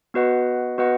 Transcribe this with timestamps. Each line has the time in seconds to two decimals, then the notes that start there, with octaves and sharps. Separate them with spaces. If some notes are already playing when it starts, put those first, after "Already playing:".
0.14 B3 F#4 B4 D#5 F#5
0.78 B3 F#4 B4 D#5 F#5